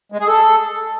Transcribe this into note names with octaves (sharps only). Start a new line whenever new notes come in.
G#3
G#4
A4